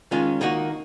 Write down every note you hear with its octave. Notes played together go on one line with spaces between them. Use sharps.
D#3 G#3 C#4 F4
D#3 A#3 D#4 F#4